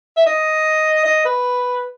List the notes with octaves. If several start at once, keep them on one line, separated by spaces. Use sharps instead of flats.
E5
D#5
D#5
B4